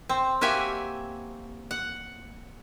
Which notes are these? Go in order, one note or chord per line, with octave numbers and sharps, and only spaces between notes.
C4
A#3 F#4 G4 E5 G#5
F#5